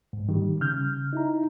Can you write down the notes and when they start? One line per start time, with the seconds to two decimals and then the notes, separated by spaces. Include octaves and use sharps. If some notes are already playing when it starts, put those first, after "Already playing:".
0.13 G#2
0.29 D#3 G3
0.61 C#3 F6 G6
1.13 D#4 E4 A#5